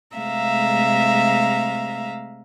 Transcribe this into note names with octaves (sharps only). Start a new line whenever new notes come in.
C3 G#3 A3 E5 F5 A#5